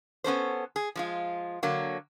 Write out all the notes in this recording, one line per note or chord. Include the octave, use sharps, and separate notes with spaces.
B3 C#4 A4 C5
G#4
F3 G#3 F4
D3 F#3 A#3